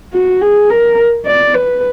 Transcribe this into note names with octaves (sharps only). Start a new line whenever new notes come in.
F#4
G#4
A#4
D5
B4